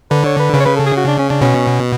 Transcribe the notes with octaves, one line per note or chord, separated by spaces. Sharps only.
D3 B4
C#5
B4
C#3 B4
C#5
B4
A4
G#4
F#4
D4
C#4
D4
B2 C#4